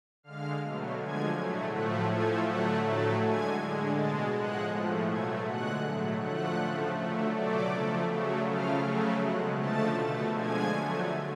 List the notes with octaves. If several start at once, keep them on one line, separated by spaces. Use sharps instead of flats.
D3 G#3 F5 F6
B2 F#3 A3
D3 F3 G#3 G#5 G#6
A2 F#3 A3
A2 F3 A3 F#5 F#6
A2 F3 A3 G#5 G#6
D3 F#3 A3 F#5 F#6
A2 F#3 A3 A5 A6
D3 G#3 G#5 G#6
D3 G#3
B2 G#3 A5 A6
A2 F3 G#3 F#5 F#6
A2 F3 A3
B2 F#3 A3 G#5 G#6
D3 G#3 F#5 F#6
A2 F#3 A3
D3 F3 A3 F#5 F#6
C#3 F3 A3
D3 F#3 A3
B2 F#3 A3 D5 D6
C#3 F3 A3
C#3 F#3 A3
C#3 F3 A3 F5 F6
C#3 F#3 A3
B2 G#3 F#5 F#6
D3 F3 A3 A5 A6
B2 A3
D3 F3 G#3 G#5 G#6
D3 F#3 A3